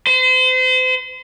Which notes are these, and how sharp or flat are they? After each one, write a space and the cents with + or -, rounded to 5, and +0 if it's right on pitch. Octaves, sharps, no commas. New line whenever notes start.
C5 -35